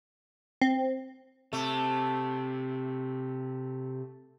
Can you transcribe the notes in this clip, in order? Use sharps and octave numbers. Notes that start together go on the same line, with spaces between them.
C4
C3 A3